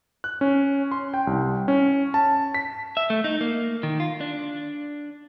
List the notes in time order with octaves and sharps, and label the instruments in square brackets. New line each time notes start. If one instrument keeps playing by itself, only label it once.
[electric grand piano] F#6
C#4
C6
G5
C2
C#4
A5
B6
[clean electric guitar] E5
A3
D#4
A#3
D#3
F4
D4